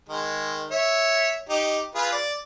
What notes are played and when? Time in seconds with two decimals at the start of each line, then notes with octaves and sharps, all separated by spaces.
0.09 D#3 G#3
0.71 C#5 E5
1.49 D#4 G4
1.95 F4 G#4 B4
2.12 D5